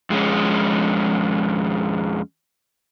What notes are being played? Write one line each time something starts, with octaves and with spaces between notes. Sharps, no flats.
F2 G#3 C#4